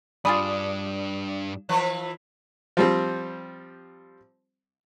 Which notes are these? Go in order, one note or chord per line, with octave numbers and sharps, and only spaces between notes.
G2 D4 F4 G#4 D5 B5 D#6
E3 F3 B4
F3 G3 C4